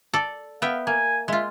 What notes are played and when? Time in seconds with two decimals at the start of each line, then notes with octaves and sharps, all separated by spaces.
0.14 A4 D5
0.62 B3 E5 F5 G5
0.87 A#3 G#5
1.28 G#3 F4 E5